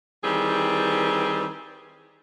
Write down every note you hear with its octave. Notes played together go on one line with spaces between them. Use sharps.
D#3 E3 G3 C4 G#4 B4